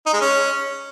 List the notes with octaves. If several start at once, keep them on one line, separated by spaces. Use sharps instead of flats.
D#4
G#3
C#4